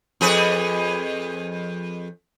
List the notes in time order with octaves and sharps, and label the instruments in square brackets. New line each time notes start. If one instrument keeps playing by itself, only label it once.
[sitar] F2 G#4 B4